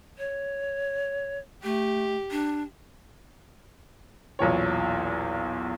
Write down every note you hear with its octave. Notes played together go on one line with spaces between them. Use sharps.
C#5
A3 G4
D4
B1 E2 A#2 C#5